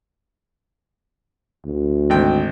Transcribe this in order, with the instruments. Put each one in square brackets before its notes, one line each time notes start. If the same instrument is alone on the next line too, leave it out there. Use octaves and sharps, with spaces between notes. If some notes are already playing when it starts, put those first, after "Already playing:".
[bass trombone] D2
[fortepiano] G#1 G5